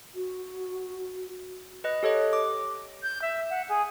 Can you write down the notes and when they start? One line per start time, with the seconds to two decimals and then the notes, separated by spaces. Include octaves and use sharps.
0.15 F#4
1.84 B4 D#5 F#6
2.03 G4 A4 C#5 D#5
2.33 D6
3.03 G6
3.22 E5
3.50 F#5
3.69 G#4